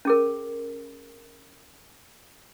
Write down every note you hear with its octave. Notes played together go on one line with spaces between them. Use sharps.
C#4 G#4 A#4